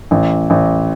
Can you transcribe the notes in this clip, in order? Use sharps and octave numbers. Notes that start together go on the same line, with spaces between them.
A1
A1